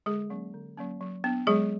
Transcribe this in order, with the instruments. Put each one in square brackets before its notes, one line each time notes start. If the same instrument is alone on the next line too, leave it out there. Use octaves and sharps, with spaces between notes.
[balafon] D3 G#3 G#4
F#3 A#3 C#4
D3
F#3 A#3 C#4
F#3
B3 D4
F#3 G#3 G#4